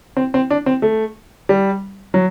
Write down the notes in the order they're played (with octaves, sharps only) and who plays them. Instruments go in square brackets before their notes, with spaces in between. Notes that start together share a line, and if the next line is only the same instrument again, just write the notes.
[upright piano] C4
C4
D4
C4
A3
G3
F#3